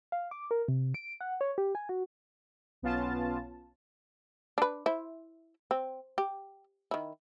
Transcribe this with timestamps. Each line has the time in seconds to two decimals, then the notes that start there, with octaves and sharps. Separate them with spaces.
0.12 F5
0.31 D6
0.51 A#4
0.68 C3
0.94 D7
1.21 F#5
1.41 C#5
1.58 G4
1.75 G#5
1.89 F#4
2.82 B1 B3 C#4 F4 A5
4.58 D4 B4
4.86 E4 C5
5.71 C4
6.18 G4
6.91 D#3 E4